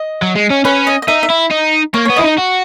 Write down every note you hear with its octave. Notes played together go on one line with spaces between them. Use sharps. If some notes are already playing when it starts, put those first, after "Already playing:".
Already playing: D#5
F#3
G#3
C#4
C#4 B4
D#5
D#5
D#4 E5
E5
E4
D#4
A#3 C#5
B3 C#5
E4 D#5
D#4
F#4